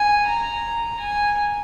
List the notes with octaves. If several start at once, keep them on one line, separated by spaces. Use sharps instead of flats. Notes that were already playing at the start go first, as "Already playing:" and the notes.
Already playing: G#5
A#5
G#5